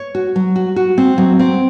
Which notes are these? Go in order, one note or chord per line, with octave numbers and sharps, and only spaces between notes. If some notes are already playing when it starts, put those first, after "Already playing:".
Already playing: C#5
F#4
F#3
F#4
F#4
C4
F#3
C4